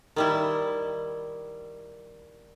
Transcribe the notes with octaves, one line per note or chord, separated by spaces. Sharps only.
D#3 G3 E4